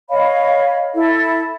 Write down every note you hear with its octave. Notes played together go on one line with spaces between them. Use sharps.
C#5 D#5 F5 B5
E4 A4